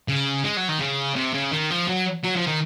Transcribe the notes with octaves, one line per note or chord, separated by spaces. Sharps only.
C#3
G#3
F#3
D#3
C#3
C3
C#3
D#3
F3
F#3
F#3
F3
D#3